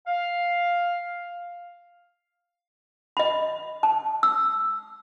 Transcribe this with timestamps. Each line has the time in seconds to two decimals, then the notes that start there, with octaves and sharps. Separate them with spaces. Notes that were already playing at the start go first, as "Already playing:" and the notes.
0.07 F5
3.17 D#5 B5
3.83 A5
4.23 E6